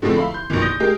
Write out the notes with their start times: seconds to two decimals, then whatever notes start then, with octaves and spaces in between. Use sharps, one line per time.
0.02 A2 D3 F3 G#3 A3 C4
0.15 E5 F5 B5 C6
0.31 C6 G6
0.50 A#1 B2 D#3 E3
0.61 D#6 G6 A#6
0.80 G#3 G4 A#4